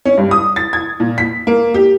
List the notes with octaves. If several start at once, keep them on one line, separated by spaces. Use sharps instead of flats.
C#4
G2
D#6
A6
G#6
A#2
B6
A#3
G4